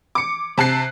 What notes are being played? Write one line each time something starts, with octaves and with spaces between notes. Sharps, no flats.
D6 C#7
C3 A5 F#6 C7